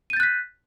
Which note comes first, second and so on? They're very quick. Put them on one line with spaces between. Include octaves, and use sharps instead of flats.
D#7 G6 A6 F#6 B6